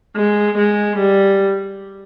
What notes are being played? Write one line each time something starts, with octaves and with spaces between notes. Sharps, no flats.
G#3
G#3
G3